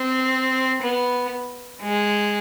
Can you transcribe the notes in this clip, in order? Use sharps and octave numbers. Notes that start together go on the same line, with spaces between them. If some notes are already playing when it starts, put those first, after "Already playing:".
Already playing: C4
B3
G#3